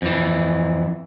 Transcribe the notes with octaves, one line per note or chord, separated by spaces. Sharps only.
F2 E3